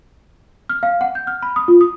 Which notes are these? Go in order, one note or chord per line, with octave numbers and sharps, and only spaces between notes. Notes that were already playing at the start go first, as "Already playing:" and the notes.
F6
F5
F#5
G6
F6
B5
D#6
F4
D#6